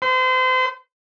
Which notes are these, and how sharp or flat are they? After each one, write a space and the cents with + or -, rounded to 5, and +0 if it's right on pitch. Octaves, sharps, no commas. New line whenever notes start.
C5 -35